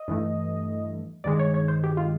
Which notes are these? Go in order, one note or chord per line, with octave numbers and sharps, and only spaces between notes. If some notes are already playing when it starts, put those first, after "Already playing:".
Already playing: D#5
G2 E3 A3
G2 D#3 G#3 D5
C#5
C#5
C5
G4
F4